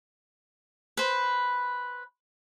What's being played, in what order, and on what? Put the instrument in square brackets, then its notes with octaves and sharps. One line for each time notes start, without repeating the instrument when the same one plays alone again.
[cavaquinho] B4 C5